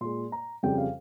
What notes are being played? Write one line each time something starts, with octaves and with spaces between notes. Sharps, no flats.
A#2 G#3 C6
A#5
F2 C#3 G3 G5
F5